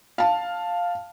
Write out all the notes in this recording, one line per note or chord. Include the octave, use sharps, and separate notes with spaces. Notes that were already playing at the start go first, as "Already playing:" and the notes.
F5 A5